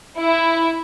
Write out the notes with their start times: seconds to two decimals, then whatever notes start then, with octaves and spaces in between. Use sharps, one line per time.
0.17 E4